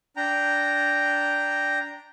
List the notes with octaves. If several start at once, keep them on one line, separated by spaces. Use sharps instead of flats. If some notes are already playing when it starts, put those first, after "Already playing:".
D4 G5 A#5